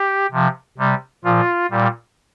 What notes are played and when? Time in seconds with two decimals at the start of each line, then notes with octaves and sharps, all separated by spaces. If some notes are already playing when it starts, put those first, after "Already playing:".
Already playing: G4
0.32 C3 F3
0.78 C3 G3
1.24 A#2 F3 F4
1.71 A#2 G3